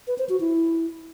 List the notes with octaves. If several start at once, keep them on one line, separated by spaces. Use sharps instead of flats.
B4
C5
F#4
E4